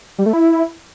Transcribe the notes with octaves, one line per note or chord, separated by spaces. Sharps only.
G3
A3
E4